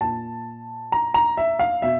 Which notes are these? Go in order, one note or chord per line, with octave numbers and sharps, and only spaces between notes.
A#2 A5
A#5
A#5
E5
F5
B2 E5